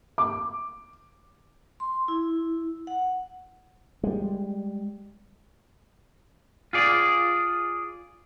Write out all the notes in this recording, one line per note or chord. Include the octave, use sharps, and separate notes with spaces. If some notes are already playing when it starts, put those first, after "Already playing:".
D6
C6
E4
F#5
G3 G#3
F4 G#4 D5